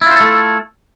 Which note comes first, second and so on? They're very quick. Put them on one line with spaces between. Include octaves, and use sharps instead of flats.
E4 F4 C5 A4 A3